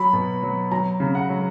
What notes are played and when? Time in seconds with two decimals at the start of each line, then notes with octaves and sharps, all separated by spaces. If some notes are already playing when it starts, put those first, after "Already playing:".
Already playing: F#3 B5
0.13 B2
0.43 F#3
0.71 F#3 A#5
1.00 C#3
1.15 F#5
1.29 F#3